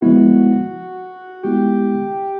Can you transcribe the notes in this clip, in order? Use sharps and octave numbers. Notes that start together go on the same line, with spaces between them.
F3 G#3 B3 E4 F#4
G#3 B3 E4 G4